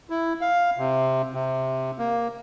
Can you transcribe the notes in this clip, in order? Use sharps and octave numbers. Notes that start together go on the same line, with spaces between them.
E4
F5
C3
C3
A#3